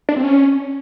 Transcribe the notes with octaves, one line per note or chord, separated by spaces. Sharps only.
D4
C4
C#4